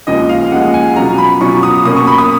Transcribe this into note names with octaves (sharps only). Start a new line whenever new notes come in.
D#2 C#3 F3 G#3 D#5
F5
D#2 C#3 F3 G#3 F#5
G#5
B2 F#3 C#4 F4 A#5
B5
B2 F#3 C#4 F4 C#6
D#6
B2 A#3 C#4 D#6
C#6
B5
D#6